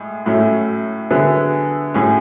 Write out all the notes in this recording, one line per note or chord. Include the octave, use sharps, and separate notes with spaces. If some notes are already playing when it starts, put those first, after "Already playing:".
Already playing: A2 G#3 G#4
A2 F#3 A3 C#4 E4
D3 F#3 B3 E4 G#4
A2 F#3 C#4 G#4